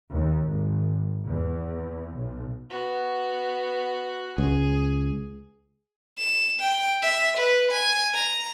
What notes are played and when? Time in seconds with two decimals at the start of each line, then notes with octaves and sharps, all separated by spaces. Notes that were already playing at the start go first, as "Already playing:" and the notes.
0.10 D#2
0.49 G#1
1.27 E2
2.16 B1
2.70 B3 F#4
4.38 C#2 G#4
6.18 E7
6.59 G5
7.02 E5
7.37 B4
7.71 G#5
8.14 A#5